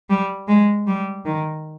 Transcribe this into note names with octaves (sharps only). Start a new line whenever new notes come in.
G3
G#3
G3
D#3